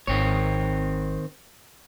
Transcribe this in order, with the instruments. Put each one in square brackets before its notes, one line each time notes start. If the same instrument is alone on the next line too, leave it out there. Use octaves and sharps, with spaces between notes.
[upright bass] G#1 [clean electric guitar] D#3 C4 C#5